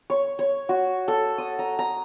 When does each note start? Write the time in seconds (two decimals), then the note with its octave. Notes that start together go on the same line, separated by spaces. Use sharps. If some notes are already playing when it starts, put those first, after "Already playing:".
0.10 C#5
0.39 C#5
0.69 F#4
1.08 A4
1.38 D#6
1.59 A#5
1.79 A#5